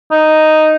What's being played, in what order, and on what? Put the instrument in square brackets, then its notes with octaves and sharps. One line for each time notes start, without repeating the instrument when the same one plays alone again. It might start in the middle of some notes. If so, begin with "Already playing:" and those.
[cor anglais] D#4